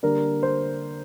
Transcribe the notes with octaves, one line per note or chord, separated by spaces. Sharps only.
D3 G3 A#3 D4 A#4
C5